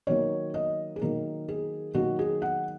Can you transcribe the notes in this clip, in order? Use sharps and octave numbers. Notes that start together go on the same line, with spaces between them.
D#3 F#3 A#3 C#5
D#5
G#4
D#3 F#3 A#3 A#4
G#4
D#3 F#3 A#3 F#4
G#4
F#5